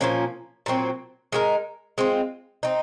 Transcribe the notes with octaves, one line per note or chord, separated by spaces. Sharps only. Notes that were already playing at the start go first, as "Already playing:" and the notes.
A#2 F3 A#3 C#4
A#2 F#3 C4
G#3 D#4 F#4 A#4
G#3 C4 F4
C4 D#4